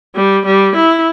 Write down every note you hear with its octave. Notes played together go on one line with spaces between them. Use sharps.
G3
G3
E4